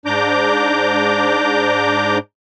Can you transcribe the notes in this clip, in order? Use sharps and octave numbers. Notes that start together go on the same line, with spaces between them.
G#2 D4 A#5 D6 G6